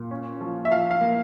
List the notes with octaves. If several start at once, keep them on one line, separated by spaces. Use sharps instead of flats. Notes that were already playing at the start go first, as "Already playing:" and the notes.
Already playing: A#2
C#4
F3
E5
F3 F5
F5
A#3